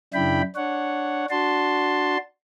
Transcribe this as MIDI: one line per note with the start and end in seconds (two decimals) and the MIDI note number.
0.14 0.42 42
0.14 0.42 49
0.14 0.42 62
0.14 0.42 64
0.14 0.42 79
0.14 0.42 83
0.56 1.26 62
0.56 1.26 73
0.56 1.26 78
1.30 2.17 62
1.30 2.17 66
1.30 2.17 81
1.30 2.17 84